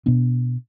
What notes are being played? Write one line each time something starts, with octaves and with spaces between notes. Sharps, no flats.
B2 B3 D4